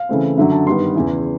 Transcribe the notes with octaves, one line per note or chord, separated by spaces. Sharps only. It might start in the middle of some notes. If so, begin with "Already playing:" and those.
Already playing: F5
C#3 E3 A3 C4
F#2 D3 F#3 E5
A5
G2 D#3 G3 B3 C6
E2 C#3 E3